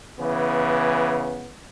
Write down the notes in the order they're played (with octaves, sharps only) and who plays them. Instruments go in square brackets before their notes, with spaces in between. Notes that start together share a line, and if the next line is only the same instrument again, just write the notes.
[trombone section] C#3 E3 B3